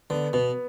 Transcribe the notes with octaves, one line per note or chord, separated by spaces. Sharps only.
D3 B3
B2 B3